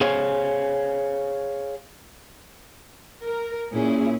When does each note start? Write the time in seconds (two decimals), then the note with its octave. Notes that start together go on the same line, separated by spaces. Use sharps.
0.01 G#4 C5 C#5 F5
3.23 A#4
3.74 A#2 C#4 E4 G#4